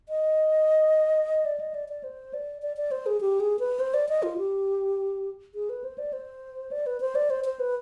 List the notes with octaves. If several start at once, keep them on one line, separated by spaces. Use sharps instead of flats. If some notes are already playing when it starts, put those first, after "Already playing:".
D#5
D5
D#5
D5
D5
C5
D5
D5
D5
C5
G#4
G4
G#4
B4
C5
D5
D#5
F4
G4
G#4
B4
C5
D5
C5
D5
B4
C5
D5
C5
C5
B4